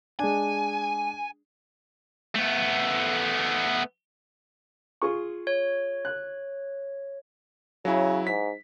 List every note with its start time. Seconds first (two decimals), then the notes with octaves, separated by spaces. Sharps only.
0.19 G#3 D4 G#5
2.35 A3 B3
5.02 F4 G#4 C#6
5.47 C#5
6.05 F#6
7.85 C#3 F#3 E4
8.27 G#2 B6